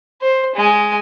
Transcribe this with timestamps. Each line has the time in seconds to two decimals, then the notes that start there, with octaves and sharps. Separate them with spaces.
0.22 C5
0.56 G#3 G#5